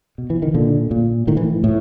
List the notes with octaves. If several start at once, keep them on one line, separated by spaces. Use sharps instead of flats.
B2
E3
D#3
A#2 D3
A#2
A2 D#3
E3
A2